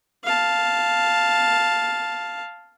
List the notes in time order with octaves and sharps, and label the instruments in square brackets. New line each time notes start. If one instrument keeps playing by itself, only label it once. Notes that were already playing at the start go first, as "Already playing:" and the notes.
[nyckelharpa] F5 A5